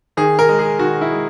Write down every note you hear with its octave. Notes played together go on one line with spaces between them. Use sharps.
D#3 G#4
A#4
G#3
G#4
D#3 F#4
E4
G#3